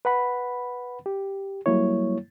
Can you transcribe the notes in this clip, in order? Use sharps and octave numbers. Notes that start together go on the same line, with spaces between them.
B4 F#5 B5
G4
F#3 G3 A#3 E4 C#5